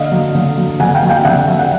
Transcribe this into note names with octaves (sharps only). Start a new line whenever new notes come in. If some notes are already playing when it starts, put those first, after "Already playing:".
Already playing: D3 D#5 F5
F#3
D3
F#3
D3 F#5 G#5
F5 G5
F#3
F5 G5
D3 E5 F#5
F#3
F#5